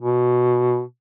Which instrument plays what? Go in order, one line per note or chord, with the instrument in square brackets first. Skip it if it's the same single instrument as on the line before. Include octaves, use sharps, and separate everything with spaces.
[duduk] B2